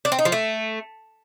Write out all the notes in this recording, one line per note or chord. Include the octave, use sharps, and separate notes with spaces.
D4
C4
D#4
F3
A3